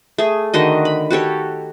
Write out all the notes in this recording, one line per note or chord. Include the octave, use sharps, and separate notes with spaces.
A3 G#4
D3 D#3 F#4 D#5
B5
F#4 G4 A4 C#5